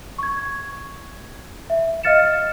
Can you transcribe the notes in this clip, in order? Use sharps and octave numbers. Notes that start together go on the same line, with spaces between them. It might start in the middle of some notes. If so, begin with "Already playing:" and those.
C#6 G#6
E5
D#5 F5 F6 A6 C#7 E7